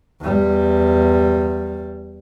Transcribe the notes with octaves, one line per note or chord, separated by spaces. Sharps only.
E2 G3